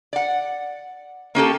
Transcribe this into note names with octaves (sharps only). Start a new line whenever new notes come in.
D5 F#5
A#3 C#4 G4 A4